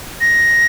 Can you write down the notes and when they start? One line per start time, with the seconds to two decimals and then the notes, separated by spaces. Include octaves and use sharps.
0.21 A#6